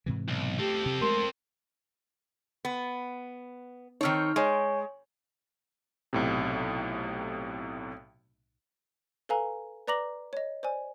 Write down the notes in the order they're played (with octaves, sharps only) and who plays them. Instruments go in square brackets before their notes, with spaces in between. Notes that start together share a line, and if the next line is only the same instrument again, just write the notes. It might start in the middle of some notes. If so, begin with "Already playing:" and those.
[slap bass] G#2 C3 E3
[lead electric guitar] B1
[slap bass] A3 [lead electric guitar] C4 A4 [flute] G4
[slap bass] C3
[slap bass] G#3 A3 [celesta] A#4 C6
[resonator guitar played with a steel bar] B3
[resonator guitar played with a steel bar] D#3 C4 C#5 [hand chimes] D#4 F6
[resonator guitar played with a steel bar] G#3 [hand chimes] C#5 G#5 C#6
[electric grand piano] B1 A2 C3
[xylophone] A4 B4 F5 G#5 A#5
B4 D5 A#5 D6 A#6 F#7
C#5 D#5
C5 D5 G#5